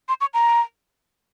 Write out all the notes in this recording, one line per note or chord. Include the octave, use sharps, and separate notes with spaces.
C6
C#6
A#5